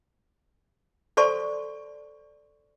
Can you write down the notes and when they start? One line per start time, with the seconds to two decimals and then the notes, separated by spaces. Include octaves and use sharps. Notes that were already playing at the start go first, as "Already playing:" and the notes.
1.17 A4 C5 D5 A5 C6 C#6